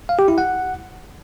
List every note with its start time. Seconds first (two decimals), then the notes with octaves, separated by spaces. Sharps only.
0.09 F5
0.19 G4
0.28 E4
0.38 F#5